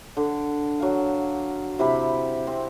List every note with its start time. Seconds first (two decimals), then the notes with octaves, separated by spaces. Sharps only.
0.17 D3
0.80 F#3 F5
1.79 C3 E4 G4 B5
2.47 C4